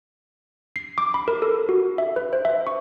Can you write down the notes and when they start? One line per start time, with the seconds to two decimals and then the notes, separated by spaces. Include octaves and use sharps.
0.76 C7
0.98 D6
1.14 B5
1.28 A#4
1.42 A4
1.69 F#4
1.98 E5
2.16 B4
2.33 C5
2.45 E5
2.67 C#6